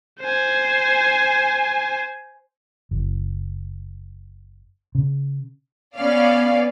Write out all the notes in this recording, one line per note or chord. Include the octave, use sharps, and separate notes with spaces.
C5 G#5
F#1
C#3
B3 C#4 D5 F5